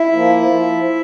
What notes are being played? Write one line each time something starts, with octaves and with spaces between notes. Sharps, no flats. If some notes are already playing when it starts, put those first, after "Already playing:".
Already playing: E4 E5
F3 A#3
F3